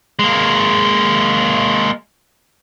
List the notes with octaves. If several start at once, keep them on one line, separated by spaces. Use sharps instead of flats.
G#3 A#3